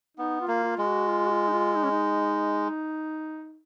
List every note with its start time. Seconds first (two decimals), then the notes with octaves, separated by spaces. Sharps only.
0.17 B3 D#4
0.41 F4
0.47 A#3
0.64 F4
0.78 G#3
0.86 F#4
1.08 F4
1.27 F#4
1.30 F4
1.48 D#4
1.53 F4
1.76 D#4
1.84 C#4
1.91 D#4